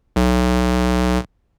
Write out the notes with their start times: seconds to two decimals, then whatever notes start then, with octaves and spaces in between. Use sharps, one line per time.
0.16 B1